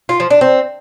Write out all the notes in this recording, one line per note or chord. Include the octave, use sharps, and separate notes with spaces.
F4
F3
D4
C4